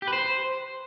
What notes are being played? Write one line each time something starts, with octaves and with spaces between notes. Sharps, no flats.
G4
B4
C5